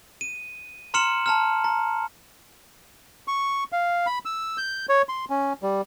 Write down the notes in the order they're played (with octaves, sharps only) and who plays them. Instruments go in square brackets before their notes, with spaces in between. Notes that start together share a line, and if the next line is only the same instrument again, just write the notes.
[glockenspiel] D#7
A#5 C6 F6 C#7 E7 F#7
A5 A#5 F6
A#5
[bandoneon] C#6
F5
B5
E6
G6
C#5
C6
C#4
G3